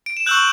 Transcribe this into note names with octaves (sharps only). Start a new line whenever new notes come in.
D7
E7
C#6 E6 F#6 G6 F#7